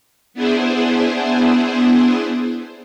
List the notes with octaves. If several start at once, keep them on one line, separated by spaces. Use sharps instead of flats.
B3 D4 E4 G#4 C5